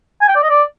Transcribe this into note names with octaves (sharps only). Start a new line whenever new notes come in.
G#5
G5
D5
D#5
D5